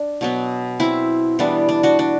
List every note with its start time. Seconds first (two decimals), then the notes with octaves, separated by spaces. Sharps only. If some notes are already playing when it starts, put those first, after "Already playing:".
Already playing: D4
0.21 B2 F#3 B3
0.80 C4 E4
1.39 E3 G3 B3 D4
1.69 D4
1.83 D4 F#4
1.99 D4